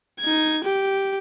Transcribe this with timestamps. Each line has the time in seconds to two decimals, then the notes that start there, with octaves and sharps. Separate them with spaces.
0.20 D#4 G#6
0.64 G4